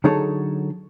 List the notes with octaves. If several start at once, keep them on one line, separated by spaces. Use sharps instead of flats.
D3 F#3 D#4 G#4 A4 C#5